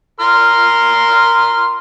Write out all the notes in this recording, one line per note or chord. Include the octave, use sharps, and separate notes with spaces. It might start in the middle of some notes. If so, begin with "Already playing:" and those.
A#4 C6 F6